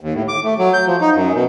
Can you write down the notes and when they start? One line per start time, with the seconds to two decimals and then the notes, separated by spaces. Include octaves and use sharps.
0.01 D#2
0.14 A2
0.28 D6
0.44 A3
0.58 F#3
0.74 G6
0.87 F3
1.01 D#4
1.15 F#2
1.35 B2